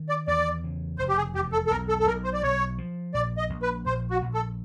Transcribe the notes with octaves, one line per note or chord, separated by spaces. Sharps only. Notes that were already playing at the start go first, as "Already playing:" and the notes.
Already playing: D#3
D5
E2 D5
C#3
F1 C5
G4
G#4
E2 G4
A4
A4
B1 A#4
A4
A4
B1 A#4
C5
D5
B1 C#5
F3
A#1 D5
D#5
A#1
B4
A#1 C5
F#4
A#1
A4